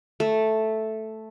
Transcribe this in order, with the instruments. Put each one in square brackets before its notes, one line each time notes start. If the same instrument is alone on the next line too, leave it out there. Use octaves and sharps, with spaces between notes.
[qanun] A3